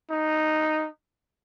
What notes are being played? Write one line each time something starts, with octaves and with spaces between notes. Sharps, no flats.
D#4